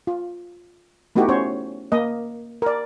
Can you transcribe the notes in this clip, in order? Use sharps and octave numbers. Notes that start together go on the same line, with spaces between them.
F4
A3 B3 D#4 E4 F#4 G4
C#4 C5 C#5
A#3 D#5
A#4 D5